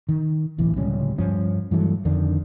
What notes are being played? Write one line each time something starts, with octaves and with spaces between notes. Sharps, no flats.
D#3
D1 B1 E3
D1 C#2 G3 C#4
G2 F3 C#4
G2 E3 F#3 A3
F2 D3 D#3 D4